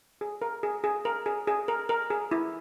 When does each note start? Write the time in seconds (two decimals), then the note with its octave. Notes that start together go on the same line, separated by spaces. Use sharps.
0.21 G#4
0.42 A#4
0.63 G#4
0.84 G#4
1.05 A#4
1.26 G#4
1.47 G#4
1.68 A#4
1.89 A#4
2.10 G#4
2.31 E4